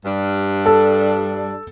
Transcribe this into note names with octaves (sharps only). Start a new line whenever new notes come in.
G2 G3 D4
A4